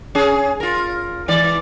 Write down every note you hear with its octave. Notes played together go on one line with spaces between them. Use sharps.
C#4 G#4
F4 A#4
G#2 E3 D5